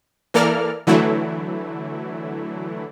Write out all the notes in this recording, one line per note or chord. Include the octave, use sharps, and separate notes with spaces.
E3 A#3 A4 A#4 D5 F6
D3 E3 F#3 A3 E4